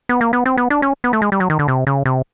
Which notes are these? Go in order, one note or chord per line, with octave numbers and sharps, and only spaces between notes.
B3
A#3
B3
C4
B3
D4
C#4
B3
A3
G#3
G3
F#3
D#3
D3
C3
C#3
C3